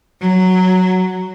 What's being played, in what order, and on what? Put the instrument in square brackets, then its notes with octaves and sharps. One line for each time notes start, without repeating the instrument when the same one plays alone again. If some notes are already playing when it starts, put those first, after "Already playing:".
[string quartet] F#3